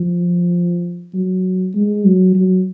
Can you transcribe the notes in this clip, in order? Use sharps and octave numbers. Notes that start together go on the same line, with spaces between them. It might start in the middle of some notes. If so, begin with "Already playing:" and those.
Already playing: F3
F#3
G#3
F#3
F#3